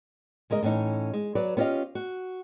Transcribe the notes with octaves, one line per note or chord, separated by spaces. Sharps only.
C#3 G#3 A#4 D#5
A2 E3 C#4 D#4
G#3
F#3 B4 D5
B3 C#4 F4 G4 D#5 F5
F#4